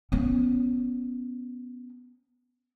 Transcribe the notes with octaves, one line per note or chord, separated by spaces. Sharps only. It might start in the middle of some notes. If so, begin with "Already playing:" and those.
B3 C#4